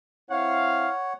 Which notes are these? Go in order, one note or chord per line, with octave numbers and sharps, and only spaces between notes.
C4 E4 C#5 F5 F#5